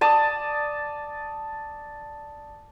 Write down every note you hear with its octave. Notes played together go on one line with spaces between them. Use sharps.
D5 A5 D#6